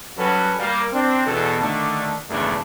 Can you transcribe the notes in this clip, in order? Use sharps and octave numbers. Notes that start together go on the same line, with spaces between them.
F#3 G3 C#4 F#4 A4 B4
G3 A#3
C4 D4
E2 B2 A4
D3 D#3 A3 D4
G#1 E2 G2 C#3 A3 D4